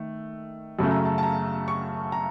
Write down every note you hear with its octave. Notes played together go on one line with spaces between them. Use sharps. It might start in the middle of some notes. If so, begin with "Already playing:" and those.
Already playing: D#3 A3
F#2 C#3 A3 A5
A#5
A5
A5
A#5
C#6
A#5